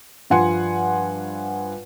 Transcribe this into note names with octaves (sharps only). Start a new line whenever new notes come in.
G2 F3 F#5 G#5 C6 C#7